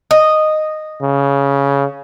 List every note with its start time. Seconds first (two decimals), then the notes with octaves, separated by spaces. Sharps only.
0.11 D#5
1.02 C#3